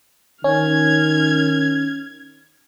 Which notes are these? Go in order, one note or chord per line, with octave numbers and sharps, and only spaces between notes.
D#3 C#4 F6 G#6